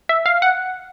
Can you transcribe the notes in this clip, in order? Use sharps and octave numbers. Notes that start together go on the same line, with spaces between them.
E5
F5
F#5